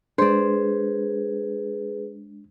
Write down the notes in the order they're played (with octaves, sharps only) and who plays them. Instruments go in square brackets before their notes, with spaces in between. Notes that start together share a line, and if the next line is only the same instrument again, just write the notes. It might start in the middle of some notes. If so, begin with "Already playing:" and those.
[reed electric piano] G#3 D4 [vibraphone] G#4 B4 [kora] C5 D5